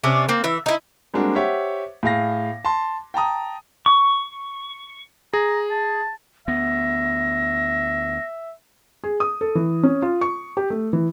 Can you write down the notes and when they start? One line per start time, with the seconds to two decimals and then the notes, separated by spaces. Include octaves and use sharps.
0.04 C3 C#4 D4
0.29 A#3 C4
0.44 E3 E5
0.66 D#4 E4
1.14 G3 G#3 A#3 C4 D4 F#4
1.35 G4 C5 C#5 E5 F#5
2.03 A2 G#4 F5 A#6
2.65 A5 C6
3.14 G5 A5 A#5 D#6
3.86 C#6
5.33 G#4 A#5
5.70 A5
6.48 D2 B3 E5 A#6
9.04 G#4
9.20 D#6
9.41 A4
9.55 E3
9.83 C#4
10.02 F4
10.21 C#6
10.57 G4
10.70 A3
10.93 E3